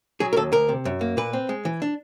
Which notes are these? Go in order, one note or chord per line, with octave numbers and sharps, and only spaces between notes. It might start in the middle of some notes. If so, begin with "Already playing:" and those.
F#3 G#4
A#4
D#2 A4
D2 A#4
C3
F#2
A#3
A#2 B4
C4
G#3
E3
D4